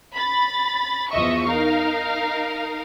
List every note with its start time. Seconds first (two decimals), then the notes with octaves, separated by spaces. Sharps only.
0.14 B5 A6
1.11 E2 F3 D#5 E5 C#6
1.46 D#4 A#4 F5